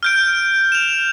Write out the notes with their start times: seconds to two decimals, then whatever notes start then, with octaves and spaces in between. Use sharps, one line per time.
0.03 F6 G6 D7
0.72 E7 F7